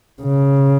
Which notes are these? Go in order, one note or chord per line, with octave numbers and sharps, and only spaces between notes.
C#3